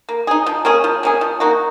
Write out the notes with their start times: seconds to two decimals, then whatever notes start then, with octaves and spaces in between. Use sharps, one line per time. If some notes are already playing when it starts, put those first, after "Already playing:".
0.09 A#3
0.27 D#4 G#4
0.46 F3
0.65 A#3 C#4 G#4
0.84 F3
1.03 A#3 C#4 G#4
1.21 F3
1.40 A#3 D#4 F#4